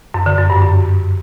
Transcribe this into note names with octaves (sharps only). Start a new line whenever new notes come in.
F#2
D3
F#2
G2
F#2